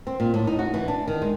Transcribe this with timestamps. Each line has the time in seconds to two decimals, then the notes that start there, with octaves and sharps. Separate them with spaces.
0.07 C4
0.20 A#2
0.34 A2
0.47 D#4
0.59 F#4
0.74 E3
0.88 D4
1.08 D#3
1.22 G#3